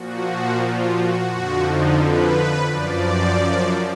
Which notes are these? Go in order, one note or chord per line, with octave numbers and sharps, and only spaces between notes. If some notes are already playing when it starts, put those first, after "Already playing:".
Already playing: A#2 F3 F#4
F4
F#4
F2 D3 F3 F#4
D#4
B4
F#2 F3 D5